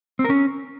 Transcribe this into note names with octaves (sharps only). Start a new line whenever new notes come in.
C4
A#4
C#4